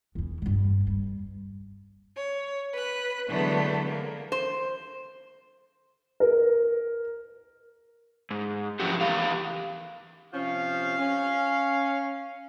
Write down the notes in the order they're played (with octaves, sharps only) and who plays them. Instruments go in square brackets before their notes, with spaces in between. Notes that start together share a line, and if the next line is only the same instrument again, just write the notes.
[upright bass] E2 E3
G2 G3
G2
[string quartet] C#5
B4 F#6
D3 E3 F#3 G#3 A3 B3
A#3
[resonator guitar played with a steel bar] C5
[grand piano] A#4
[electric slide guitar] G#2
F3 F#3 C#4 E4 F#4 G4
E2 G4 F5
[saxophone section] C3 F3 C#4 [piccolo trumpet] F5
[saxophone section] C#4